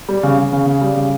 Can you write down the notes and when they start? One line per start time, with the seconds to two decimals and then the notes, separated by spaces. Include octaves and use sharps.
0.09 G3
0.23 C#3
0.37 C#3
0.53 C#3
0.66 C#3
0.81 G3
0.96 C#3